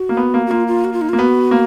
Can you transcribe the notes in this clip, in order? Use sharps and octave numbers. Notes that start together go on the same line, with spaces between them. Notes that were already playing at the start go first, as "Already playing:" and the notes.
Already playing: F#4
A#3
B3
A#3
F#4
A#3 F4
F4
F#4
F4
D#4
F4
A#3
B3 F#4
A#3